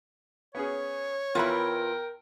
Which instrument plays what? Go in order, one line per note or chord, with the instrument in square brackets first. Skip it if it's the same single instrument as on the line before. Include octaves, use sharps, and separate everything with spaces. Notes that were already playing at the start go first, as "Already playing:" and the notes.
[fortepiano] B3 C#4 G#4 [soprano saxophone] C#5
[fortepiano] E2 E4 [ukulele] F4 B4 B5 [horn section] A#4 G5